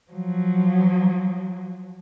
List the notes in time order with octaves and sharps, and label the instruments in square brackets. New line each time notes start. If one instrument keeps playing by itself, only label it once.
[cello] F3 F#3